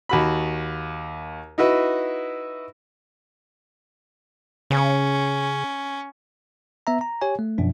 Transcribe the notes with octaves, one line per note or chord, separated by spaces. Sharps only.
D#2 F#4 B5
D#4 E4 F#4 B4
C#3 C#4
B3 E5 A#5
A#5
G4 C#5 G#5
A3
F#2 B2 F3 D4